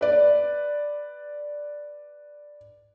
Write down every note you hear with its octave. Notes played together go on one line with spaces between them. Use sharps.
B4 D5